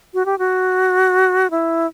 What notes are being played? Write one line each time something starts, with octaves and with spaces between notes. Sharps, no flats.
F#4
G4
F#4
E4